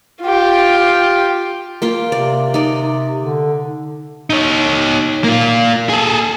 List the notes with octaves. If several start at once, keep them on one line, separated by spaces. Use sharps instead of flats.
F4 G4
A#3 F4 G5
C3 D5
D#4 D5
D3
D#4 C#5
A#3 F4
G#4 A4